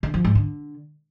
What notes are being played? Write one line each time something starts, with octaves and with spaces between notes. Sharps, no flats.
D3
F3
G#2
D3